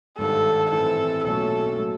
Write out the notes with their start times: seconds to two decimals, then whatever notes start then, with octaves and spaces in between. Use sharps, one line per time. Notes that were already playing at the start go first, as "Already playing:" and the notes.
0.18 G#1 G2 D#3 A4
0.71 A2 E3 A3 C4 A4
1.24 B1 A#2 F#3 A3 C#4 A4
1.77 A2 F#3 A3